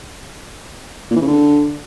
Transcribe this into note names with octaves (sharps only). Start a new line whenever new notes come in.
A#2
E3
C#3
D3